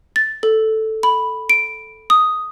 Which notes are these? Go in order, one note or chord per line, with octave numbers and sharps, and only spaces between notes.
A6
A4
B5
D7
D#6